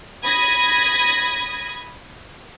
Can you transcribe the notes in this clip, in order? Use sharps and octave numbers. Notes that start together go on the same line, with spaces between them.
B5 D#6 G#6 A#6